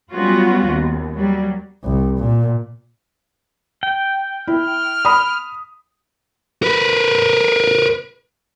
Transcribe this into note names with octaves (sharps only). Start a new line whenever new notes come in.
F#3 G3 B3 C#4 F4 F#4
D#2
F#3 G3
C2
A#2
G5
E4 F6
B5 D#6
A#4 B4